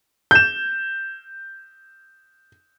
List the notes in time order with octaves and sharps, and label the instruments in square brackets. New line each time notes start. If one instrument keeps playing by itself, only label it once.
[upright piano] G6 E7